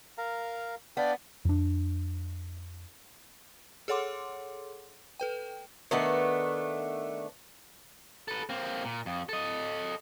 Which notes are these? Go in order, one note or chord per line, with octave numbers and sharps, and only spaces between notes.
A#4 F5 A#5
B3 D4 D5 F5 G5
F2 D4
G#4 A4 C#5 F#5 C6 D6
A4 B4 G5
D#3 A3 B3 D4
A4 B4
A#3 C4
A#2
F2
A4 D#5